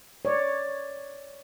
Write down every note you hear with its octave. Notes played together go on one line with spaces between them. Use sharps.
C#5 D5